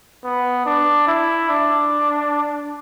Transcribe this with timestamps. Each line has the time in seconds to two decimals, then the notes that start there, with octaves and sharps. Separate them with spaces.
0.24 B3
0.66 D4
1.07 E4
1.49 D4